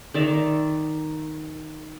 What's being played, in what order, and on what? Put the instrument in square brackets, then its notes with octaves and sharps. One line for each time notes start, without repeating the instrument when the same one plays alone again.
[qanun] D#3 D5 E5 A#5